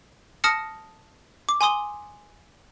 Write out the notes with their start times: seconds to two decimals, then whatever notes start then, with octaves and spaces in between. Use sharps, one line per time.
0.44 A5 D#6 F6 A#6 C#7
1.49 D6
1.61 G#5 C6 D#6 G7